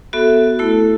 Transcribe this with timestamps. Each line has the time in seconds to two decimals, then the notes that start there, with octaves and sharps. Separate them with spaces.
0.13 B3 F#4 A4 E5
0.59 A3 E4 A4